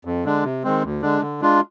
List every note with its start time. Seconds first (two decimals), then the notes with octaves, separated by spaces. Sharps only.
0.05 F2
0.25 D3 G#3 D4
0.44 C3
0.63 D#3 G#3 C4
0.83 D2
1.02 D3 G#3 D4
1.22 D3
1.41 G#3 D4 F4